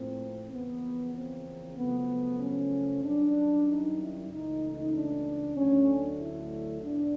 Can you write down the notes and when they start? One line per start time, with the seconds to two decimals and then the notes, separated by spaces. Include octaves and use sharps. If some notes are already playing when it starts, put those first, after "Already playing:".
Already playing: A2 F3 A#3 C4
0.51 E2 C#3 F3 A#3 B3
1.14 C4
1.77 F#2 C#3 F3 A3 B3
2.40 C#4
3.03 F#2 D#3 G3 D4
3.67 D#4
3.98 E4
4.30 C#2 C#3 E3 A3 D#4
4.93 D4
5.56 D2 D3 F#3 A3 C#4
5.88 D4
6.20 E4
6.82 G#2 E3 G#3 B3 D4